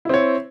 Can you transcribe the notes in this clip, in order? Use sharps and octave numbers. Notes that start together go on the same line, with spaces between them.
C4 E4 C#5